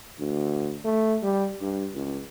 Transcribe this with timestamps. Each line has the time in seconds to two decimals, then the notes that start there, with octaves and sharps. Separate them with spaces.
0.20 D2
0.85 A3
1.23 G3
1.61 G2
1.95 C#2